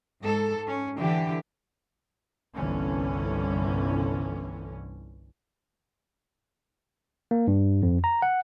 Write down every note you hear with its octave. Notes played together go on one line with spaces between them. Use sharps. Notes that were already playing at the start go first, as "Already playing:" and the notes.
G#2 A4
C#4
D3 E3 G4
G1 C2 D3 E3 C#4
A#3
G2
F2
A#5
F#5